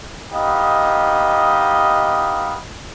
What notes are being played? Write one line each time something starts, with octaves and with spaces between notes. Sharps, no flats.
B3 D#4 G4 D#5 F5